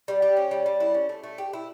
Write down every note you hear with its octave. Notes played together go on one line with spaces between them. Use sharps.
G3
G4
C#4
G3
G3
E4
C#4
A3
A3
G4
E4